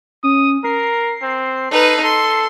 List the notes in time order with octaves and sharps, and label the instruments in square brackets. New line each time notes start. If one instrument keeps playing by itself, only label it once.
[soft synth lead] C#4 [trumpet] D#6
[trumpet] A#4 [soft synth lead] C7
[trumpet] C4
[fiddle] D#4 B4 [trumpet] A4
[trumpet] A4 [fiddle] C6